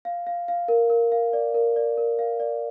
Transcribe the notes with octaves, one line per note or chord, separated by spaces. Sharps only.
F5
F5
F5
A#4
A#4
F5
D5
A#4
D5
A#4
F5
D5